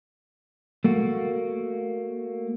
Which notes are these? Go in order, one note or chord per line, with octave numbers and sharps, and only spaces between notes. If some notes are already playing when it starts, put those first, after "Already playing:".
A3 A#3 F#4